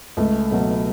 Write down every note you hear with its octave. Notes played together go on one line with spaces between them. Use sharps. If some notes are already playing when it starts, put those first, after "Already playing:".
C#2 A3
B2 F#3 A3